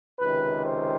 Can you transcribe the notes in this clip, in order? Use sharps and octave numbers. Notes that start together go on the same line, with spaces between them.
C#2 C3 D#3 B4
C5